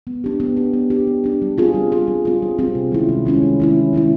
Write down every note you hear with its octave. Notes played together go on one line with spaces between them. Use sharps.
B3
D4 G4
B3
D4 G4
B3
D4 G4
B3
D4 G4
G3
C4 F4 G#4
G3
C4 F4 G#4
G3
C4 F4 G#4
G3
C4 F4 G#4
C3
D#3 G#3 C#4 E4
C3
D#3 G#3 C#4 E4
C3
D#3 G#3 C#4 E4
C3
D#3 G#3 C#4 E4